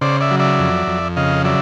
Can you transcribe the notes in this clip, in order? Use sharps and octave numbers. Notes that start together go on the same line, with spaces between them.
C#3 C5 D5
D5 E5
F#3
D5 E5
F2
F2
C#3 D#5 F5
F#3 D5 E5